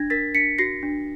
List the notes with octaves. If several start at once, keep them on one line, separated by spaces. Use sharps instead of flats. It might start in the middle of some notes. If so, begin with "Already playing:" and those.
Already playing: D4 G#6 A#6
A#4 A6 B6
D4 B6 C#7
F#4 A#6 C7
D4